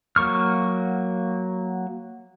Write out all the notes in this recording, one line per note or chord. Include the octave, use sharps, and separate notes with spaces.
F#3 A#3 C#6 F6